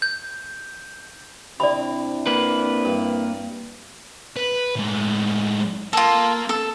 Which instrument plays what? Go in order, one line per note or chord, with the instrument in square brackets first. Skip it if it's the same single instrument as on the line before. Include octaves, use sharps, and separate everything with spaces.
[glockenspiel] G6
[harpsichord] C3 [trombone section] C4 D4 E4 [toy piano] D5 B5
[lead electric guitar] A#3 B4
[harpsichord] G2
[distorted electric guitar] B4
A2 G#3
[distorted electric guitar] A#3 [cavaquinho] F4 A4
[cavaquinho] A4